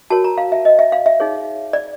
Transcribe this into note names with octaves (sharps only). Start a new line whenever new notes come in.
F#4 A#4 C#5 A5
A#5
F5
E5
D#5
E5
F5
E5
D#4 G#4 C#5
D5